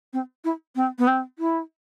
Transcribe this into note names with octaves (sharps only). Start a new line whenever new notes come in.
C4
E4
C4
B3
C4
E4